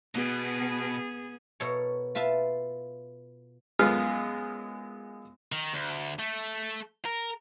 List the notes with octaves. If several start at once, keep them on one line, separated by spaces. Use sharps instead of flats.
B2 B3 G#4
B2 A4 A#4 C#5
F4 B4 E5 F5 A5
F#2 G#3 B3 F4 F5 F6
D#3
D2
A3
A#4